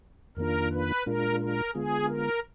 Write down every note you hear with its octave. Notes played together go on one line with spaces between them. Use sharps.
F2 D#3 A#3 D4 F4 A#4
B4
A#2 G#3 D4 F4 A#4
A#4
D3 G#3 B3 F4 G#4
A#4